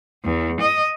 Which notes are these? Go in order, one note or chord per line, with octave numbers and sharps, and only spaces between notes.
E2
D#5